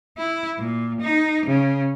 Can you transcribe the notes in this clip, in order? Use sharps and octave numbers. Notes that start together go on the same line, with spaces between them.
E4
A#2
D#4
C#3